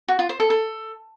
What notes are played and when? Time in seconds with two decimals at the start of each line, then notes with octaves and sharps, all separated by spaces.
0.08 F#4
0.19 F4
0.29 C5
0.40 A4
0.50 A4